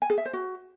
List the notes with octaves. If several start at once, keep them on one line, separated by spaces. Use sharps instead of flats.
G#5
G#4
E5
C5
F#4